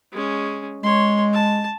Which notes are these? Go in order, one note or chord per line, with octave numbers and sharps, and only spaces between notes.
G#3 C#4
G#3 C#5 C6
A5